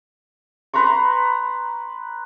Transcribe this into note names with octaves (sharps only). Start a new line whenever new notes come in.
B4 A#5 C6 C#6